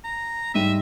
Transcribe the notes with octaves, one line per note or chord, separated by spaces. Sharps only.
A#5
G#2 G3 E5 D#7